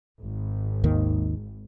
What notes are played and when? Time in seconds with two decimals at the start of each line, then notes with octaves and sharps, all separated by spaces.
0.23 G#1
0.84 D#2 D#3